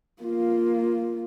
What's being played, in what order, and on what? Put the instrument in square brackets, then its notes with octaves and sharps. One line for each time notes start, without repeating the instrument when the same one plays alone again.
[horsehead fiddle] A#3 F4